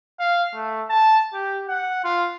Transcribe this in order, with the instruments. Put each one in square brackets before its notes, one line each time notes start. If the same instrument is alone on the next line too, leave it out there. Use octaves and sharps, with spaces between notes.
[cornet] F5
A3
A5
G4
F#5
F4